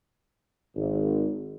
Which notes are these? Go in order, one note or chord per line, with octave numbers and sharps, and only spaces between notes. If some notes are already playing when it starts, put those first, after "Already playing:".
G#1